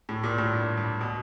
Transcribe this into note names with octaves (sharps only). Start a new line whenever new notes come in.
A2
A#2
A2
G2
G2
B2